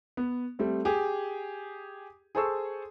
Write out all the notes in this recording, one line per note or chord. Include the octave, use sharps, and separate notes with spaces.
B3
G3 A3 C4
G4 G#4
G#4 A4 C5 A5 C#6 E6